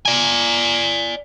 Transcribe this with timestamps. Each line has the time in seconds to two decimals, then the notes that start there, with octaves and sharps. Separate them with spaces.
0.05 D5 G#5